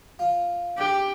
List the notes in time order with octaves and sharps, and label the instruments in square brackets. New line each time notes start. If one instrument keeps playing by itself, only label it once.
[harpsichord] F4
[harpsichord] D4 [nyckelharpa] G4